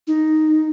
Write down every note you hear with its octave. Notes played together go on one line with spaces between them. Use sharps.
D#4